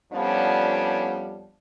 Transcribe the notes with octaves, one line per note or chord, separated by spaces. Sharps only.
F2 F3 G3 B3 C#4 D4